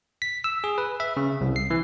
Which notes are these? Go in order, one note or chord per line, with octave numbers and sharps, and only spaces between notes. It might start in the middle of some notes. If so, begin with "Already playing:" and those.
B6
E6
G#4
B4
E5
C#3
C2
C7
E3